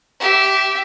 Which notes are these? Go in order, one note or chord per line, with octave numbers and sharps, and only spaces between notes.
G4 E5